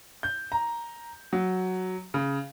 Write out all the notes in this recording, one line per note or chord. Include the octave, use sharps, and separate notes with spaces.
G6
A#5
F#3
C#3